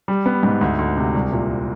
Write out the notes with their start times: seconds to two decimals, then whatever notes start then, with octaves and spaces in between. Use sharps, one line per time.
0.08 G3
0.26 B3
0.43 G#2
0.61 D2
0.79 D2
0.97 C3
1.15 C2
1.32 A#2